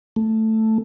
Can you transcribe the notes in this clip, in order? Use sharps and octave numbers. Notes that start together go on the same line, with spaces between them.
A3